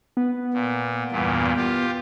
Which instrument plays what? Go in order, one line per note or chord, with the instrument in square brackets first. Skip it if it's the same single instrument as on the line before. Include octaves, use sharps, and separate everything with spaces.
[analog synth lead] B3
[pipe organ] A#2
E2 G2 A#2
F4 G4